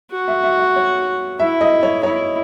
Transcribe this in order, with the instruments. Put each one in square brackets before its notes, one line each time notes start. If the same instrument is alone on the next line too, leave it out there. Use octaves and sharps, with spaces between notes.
[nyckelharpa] F#4
[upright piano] E5
E5
E5
C#5
[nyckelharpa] E4 [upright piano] E5
[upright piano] D#5
C#5
[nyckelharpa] E4 [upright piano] C#5